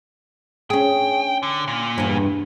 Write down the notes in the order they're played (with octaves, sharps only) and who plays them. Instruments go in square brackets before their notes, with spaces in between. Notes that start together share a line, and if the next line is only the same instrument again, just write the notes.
[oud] C#4 G#4 [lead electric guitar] G5
[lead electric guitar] D3
A#2
[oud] E2 G2